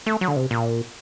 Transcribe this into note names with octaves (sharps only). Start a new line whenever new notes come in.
A3
F#3
D3
C3
A#2